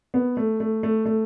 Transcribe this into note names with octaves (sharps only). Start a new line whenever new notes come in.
B3
A3
A3
A3
A3